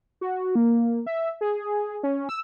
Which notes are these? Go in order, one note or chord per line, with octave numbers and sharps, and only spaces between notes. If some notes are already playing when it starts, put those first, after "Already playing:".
F#4
A#3
E5
G#4
C#4
E6